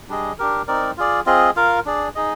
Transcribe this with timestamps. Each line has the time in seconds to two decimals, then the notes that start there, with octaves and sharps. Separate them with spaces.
0.09 G3 D4 G#4 D#5
0.38 D4 G4 A#4
0.68 C4 D#4 A#4 D5
0.97 F4 G#4 D5
1.26 C4 F4 G#4 D#5
1.56 F4 A#4 F5
1.86 D4 G#4 D5
2.15 D#4 G#4 D#5